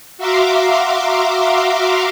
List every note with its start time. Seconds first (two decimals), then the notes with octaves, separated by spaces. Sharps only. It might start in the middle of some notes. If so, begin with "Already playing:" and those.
0.18 F#4 E5 F5 A#5 C6 D6